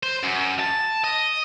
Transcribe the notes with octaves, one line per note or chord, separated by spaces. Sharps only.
C5
F#2
A5
D#5